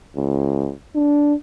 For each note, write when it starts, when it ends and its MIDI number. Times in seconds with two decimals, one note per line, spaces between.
0.16 0.72 37
0.95 1.34 62